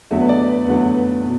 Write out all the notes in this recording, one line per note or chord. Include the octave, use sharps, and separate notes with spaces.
E2 D3 F#3 A3 E5
B4
D5
B4
E2 D3 F#3 A3 B4
B4
B2